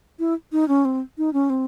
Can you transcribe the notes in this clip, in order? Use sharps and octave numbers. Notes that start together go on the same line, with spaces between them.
E4
D#4
C#4
C4
D#4
C#4
C4